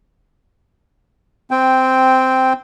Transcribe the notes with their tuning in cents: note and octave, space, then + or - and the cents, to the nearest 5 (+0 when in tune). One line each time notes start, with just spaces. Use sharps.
C4 -10 G5 +0